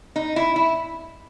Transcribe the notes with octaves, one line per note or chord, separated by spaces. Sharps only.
D#4
E4
E4